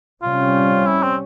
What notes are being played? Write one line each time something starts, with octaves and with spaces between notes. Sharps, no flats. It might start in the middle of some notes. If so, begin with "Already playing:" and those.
C3 G3 C#4 F4
E4
C4